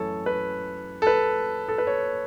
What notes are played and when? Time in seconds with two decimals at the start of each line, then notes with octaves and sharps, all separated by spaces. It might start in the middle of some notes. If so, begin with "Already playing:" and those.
Already playing: F#2 E3 A3 C#4 A4 C#5
0.26 B4
1.02 A4
1.07 B4
1.68 A4
1.78 B4
1.87 C#5